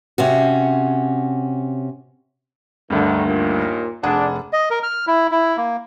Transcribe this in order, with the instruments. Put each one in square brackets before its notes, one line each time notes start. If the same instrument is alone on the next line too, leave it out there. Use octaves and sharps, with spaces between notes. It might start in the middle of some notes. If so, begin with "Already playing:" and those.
[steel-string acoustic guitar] C3 C#4 F#4
[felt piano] D2 G2 [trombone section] D3 D#3
[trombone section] D#2 A#2
[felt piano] F1 G#4 F#5 [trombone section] D4
[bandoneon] D#5
A#4
F6
E4
E4
A#3